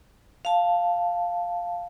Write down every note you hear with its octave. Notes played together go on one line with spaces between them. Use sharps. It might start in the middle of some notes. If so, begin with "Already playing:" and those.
F5 A5